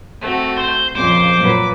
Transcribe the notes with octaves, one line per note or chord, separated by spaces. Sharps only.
A3 C4 F#4
C5
F2 A#2 C#3 C5 D6
F#2 A#2 B4